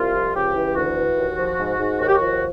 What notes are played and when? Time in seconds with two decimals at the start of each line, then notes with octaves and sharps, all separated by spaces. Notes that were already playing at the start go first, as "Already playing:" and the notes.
Already playing: C2 F4
0.15 F3
0.35 C#2 G4
0.55 E3
0.76 D2 F#4
0.97 E3
1.18 D#2
1.38 F3
1.59 G#2
1.80 G#2
2.00 D#2 F#4
2.08 G4
2.15 F#4
2.21 F3